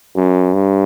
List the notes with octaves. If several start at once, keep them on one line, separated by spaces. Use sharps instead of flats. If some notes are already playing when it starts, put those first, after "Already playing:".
F#2
G2